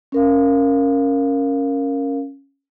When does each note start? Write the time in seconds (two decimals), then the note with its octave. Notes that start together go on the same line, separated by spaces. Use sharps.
0.12 C#4 A#4 F5